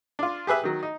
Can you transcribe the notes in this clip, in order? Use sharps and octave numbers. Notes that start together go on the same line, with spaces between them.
D4 F4
G4 G#4 B4 E5
D#3 F#3
D#4